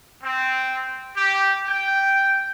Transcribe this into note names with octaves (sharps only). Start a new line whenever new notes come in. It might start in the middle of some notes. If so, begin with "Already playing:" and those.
C4
G4
G5